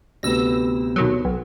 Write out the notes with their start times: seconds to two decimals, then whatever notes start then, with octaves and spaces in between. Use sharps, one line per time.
0.23 D2 C3 B3 E6 A#6
0.96 B2 D#3 F#3
1.25 B1